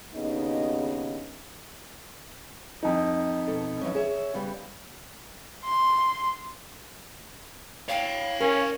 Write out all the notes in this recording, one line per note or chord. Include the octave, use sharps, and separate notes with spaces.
D#2 C#3 B3 D4 D#4 D#5
F2 D#4
B2 A4
E3 F#3 C#4
G#4 C#5 E5
C#3 G3 B3
C6
C#5 F5 G5
C#4 A#4